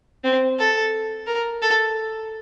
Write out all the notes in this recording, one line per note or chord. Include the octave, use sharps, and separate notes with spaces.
C4
A4
A#4
A4